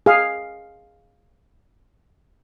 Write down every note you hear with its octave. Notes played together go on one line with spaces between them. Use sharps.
G#4 F5